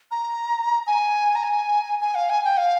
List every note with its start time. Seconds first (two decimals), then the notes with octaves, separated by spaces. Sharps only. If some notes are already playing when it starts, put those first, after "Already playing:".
0.11 A#5
0.87 G#5
1.35 A#5
1.44 G#5
2.01 G#5
2.15 F5
2.30 G#5
2.44 G5
2.58 F5